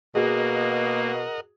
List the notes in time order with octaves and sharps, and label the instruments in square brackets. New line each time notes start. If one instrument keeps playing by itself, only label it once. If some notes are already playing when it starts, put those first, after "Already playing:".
[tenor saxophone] B2 [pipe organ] A#3 [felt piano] F#4 G#4 [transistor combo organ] A#4 D#5 F#5